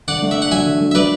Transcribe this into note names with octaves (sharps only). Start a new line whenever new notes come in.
D3 D5 F#5
A3
E5
D4 F#5
F#3 E5 G#5
D3
A3
E5
F#3 B4 D5